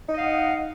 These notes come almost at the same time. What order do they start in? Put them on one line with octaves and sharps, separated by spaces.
D#4 D#5 F5 F#5